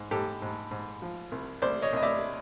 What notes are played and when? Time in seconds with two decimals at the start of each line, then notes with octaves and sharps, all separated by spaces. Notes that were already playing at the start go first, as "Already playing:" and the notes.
Already playing: G#2
0.11 G#2 G4 A4
0.42 G#2
0.71 G#2
1.02 F3
1.32 C2
1.62 C2 C5 D5
1.82 C#5 D#5
1.93 C2 D#5
2.03 D5 E5